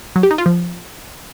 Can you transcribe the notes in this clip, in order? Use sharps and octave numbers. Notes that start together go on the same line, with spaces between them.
F#3
G4
D#4
F4
F3